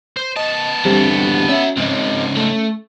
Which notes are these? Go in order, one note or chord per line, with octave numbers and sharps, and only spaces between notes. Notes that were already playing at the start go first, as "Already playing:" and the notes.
C5
B3 D#5 A5
E2 D3 G3 C4 G4
C#4 F#4 E5
C#2 G#2 C4 D#4
A3